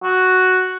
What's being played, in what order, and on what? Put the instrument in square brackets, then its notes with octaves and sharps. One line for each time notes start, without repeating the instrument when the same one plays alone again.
[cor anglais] F#4